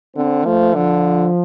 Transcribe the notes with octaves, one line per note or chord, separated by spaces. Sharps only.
D3 C4
F3 A3
D3 F3